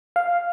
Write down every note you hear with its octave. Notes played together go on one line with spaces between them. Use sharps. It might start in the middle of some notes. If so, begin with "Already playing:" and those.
F5